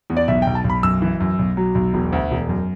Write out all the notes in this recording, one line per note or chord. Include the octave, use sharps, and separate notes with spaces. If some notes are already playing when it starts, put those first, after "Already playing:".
E2
D5
B1 E5
B1 G5
A5
B1
B5
F#2 E6
E3
F#2
B1
F#3
B1
E1
D2
E1
F#2